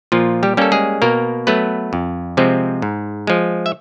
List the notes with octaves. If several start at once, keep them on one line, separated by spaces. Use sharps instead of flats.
A#2 F3 F4
G3 G4
G3 A#3 C#4 A4
G#3 G#4
B2 A#3 A#4
F#3 A3 B3 B4
F2
C3 F3 G#3 C4
G#2
F3 G#3
E5